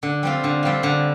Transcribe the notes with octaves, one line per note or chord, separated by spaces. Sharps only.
D3
G3 C4 F4
D3
G3 C4 F4
D3